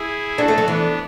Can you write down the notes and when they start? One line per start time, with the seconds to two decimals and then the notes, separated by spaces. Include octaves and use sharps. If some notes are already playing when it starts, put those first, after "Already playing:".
Already playing: E4 G#4
0.38 D4 F#4 A4
0.48 A3
0.58 F#3
0.68 E3 B3 D4